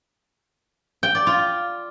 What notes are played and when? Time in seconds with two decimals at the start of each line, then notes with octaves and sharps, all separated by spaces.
1.03 G5
1.15 D5
1.27 F4